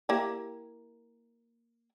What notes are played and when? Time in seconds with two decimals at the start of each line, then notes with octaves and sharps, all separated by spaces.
0.09 A#3 E4 G4